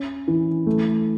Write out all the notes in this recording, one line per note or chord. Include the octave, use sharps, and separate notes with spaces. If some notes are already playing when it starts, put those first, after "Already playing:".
Already playing: C#4
E3
A3